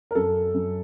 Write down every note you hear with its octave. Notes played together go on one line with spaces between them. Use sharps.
A#4
F#2 A4
F#2